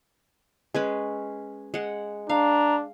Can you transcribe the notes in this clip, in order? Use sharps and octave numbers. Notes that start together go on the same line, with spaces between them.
G#3 C#4 B4
G#3 F#5
D4 F5 A#5